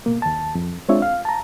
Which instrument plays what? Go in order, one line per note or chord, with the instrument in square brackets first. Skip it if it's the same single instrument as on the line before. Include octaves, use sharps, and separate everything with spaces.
[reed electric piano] B2 A#3
D#2 A5
F2
G#3 C4 D4 F4 C#5 E5
F5
A5 A#5